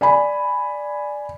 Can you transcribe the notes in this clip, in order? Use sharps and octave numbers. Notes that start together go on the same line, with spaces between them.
D5 G#5 B5